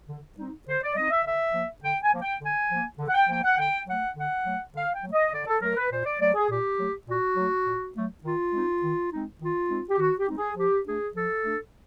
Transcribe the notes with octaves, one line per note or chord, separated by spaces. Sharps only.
D3
G3 C4 D#4
D3 C5
D5
G3 C4 D#4 D#5
E5
D3 E5
F3 A#3
D3 G5
G#5
F3 A#3
G5
D3 G#5
F3 A#3
D3
F#5
G5
F3 A#3 G5
F#5
D3 G5
F#3 A3 F#5
D3 F#5
F#3 A3
D3 F5
G5
F#3 A3
D#5
D3 D5
A4
F#3 A3 A#4
B4
A#2 C5
D5
F#3 A3 D5
G#4
A#2 G4
F#3 A3
A#2 F#4
F#3 A3
A#2
F#3 A3
D#3 F4
G#3 C4 D#4
D#3
G#3 C4 D#4
D#3 F4
G#3 C4 D#4
G4
D#3 F#4
G4
G#3 C4 D#4
G#4
F3 G4
A3 D4 G#4
F3 A4
A3 D4